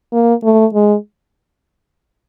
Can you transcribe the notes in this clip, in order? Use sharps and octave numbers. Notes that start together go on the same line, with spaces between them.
A#3
A3
G#3